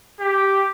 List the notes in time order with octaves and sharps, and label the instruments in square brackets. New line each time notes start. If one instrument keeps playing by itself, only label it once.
[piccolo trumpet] G4